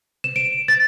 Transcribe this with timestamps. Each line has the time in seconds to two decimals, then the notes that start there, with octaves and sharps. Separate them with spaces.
0.24 E7
0.36 D7
0.68 A6